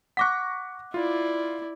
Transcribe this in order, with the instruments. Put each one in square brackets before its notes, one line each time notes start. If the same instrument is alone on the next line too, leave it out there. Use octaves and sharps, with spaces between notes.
[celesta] F#5 D6 F#6 [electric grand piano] C#6 A#6 B6
[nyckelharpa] E4 D5 [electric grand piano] F4